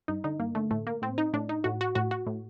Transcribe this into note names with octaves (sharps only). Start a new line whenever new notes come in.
G2 D#4
D3 D#4
G2 A#3
D3 A3
A2 A3
A#3
A2 C4
D#4
A2 D4
D#4
A2 F#4
F#4
A2 F#4
F#4
A2